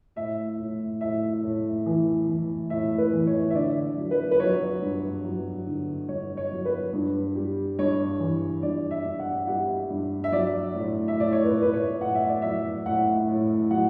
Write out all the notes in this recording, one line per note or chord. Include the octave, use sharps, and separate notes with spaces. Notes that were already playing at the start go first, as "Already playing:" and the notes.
A2 E5
A2
A2 E5
A2
E3
E3
A2 E5
B4
E3
C#5
E5
D3 D5
F#3
B4
B4
F#3 C#5
G2
F#3
D3
G2 C#5
C#5
F#3
B4
G2
G3
G2 C#5
E3
G2 D5
E5
G2
F#5
G3 F#5
G2
E5
F#3 D5
A2
E5
A2 D5
C#5
B4
A2 B4
C#5
A2 F#5
E5
D5
F#3 E5
A2 F#5
A2
F#3 F#5